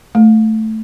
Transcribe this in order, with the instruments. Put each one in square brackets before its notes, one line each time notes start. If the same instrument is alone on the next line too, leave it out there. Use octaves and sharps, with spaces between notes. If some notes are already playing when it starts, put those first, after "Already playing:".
[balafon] A3